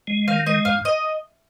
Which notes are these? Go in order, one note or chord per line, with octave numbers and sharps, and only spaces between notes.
G#3
D#3 F5
G#3 D#5
G2 F5
D#5